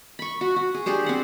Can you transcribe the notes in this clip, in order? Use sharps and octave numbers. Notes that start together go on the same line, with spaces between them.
B5 C#6
F#4
F#4
G#4
D4 G4 G#4 C5
C4 F#5